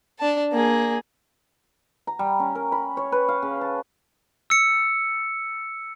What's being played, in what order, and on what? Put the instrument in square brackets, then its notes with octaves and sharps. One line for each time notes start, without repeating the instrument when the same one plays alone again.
[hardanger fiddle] D4 A5
A#3 G#4
[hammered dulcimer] A#5
G3
C#4
A#4
B5
C#5
B4
F5
C#3
A5
[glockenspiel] E6 C#7